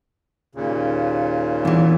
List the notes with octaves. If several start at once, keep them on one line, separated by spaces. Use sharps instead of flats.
D#2 A#2 C#3
E2 E3